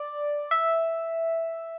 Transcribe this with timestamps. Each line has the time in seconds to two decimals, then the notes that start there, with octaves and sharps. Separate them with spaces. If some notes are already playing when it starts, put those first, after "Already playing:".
Already playing: D5
0.51 E5